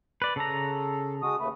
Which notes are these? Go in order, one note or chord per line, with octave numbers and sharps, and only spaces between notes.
B4 D5
C#3 A4 A#5
G#3 F#4 D#6
D#2 A3 B4